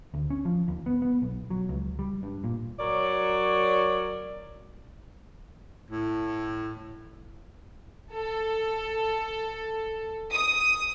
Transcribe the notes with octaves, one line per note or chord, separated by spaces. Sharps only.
D2
C#4
F3
D#2
B3
B3
B1
F#3
C#2
G3
G2
A#2
F#3 A#4 C#5 D5
A2
A4
D#6